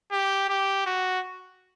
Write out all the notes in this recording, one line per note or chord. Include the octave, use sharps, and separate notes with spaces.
G4
G4
F#4